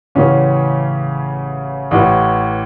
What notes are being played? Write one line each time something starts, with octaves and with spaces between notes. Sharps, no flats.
A1 A2 C#3 E3 C#4
A1 A2 E3